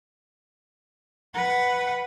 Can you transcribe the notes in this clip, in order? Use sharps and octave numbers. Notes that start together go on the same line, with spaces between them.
B4 F#5